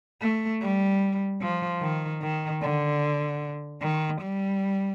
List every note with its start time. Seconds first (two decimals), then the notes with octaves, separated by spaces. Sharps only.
0.21 A3
0.61 G3
1.41 F3
1.82 D#3
2.22 D#3
2.62 D3
3.82 D#3
4.21 G3